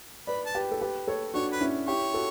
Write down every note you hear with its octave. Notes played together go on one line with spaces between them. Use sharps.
B4 D5 B5
A5
G4 B4
A4
G4 B4
A4 C#5
D4 F#4 C#5
B4
C#4 E4
E4 G4 C#5
F#4 A4